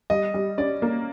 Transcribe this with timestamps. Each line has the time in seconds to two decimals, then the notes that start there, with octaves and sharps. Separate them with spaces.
0.10 G3 D#5
0.34 G3
0.58 C#4 D5
0.82 A#3